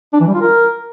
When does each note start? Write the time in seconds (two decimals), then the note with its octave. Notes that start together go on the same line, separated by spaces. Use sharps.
0.13 D4
0.20 E3
0.27 G3
0.34 F4
0.41 A#4